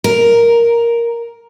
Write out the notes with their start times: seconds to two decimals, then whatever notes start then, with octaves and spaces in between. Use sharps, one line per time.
0.04 A#4